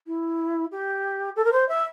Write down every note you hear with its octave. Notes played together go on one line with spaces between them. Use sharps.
E4
G4
A4
A#4
C5
E5